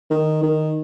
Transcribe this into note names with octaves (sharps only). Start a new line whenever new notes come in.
D#3
D#3